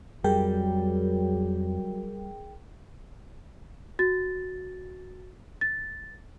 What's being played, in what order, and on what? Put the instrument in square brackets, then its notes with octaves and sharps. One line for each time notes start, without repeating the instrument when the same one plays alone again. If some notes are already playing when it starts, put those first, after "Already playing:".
[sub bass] F2 [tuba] F#3 [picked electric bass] G3 [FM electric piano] G#4 A#4 G5
[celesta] F#4 A6
A6